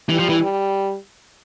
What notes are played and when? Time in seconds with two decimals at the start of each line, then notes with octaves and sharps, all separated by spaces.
0.09 E3 G3
0.19 F3
0.29 E3
0.40 G3